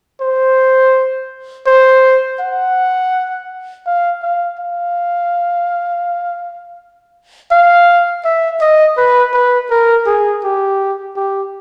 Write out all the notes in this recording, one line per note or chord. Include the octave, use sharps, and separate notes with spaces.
C5
C5
F#5
F5
F5
F5
F5
E5
D#5
B4
B4
A#4
G#4
G4
G4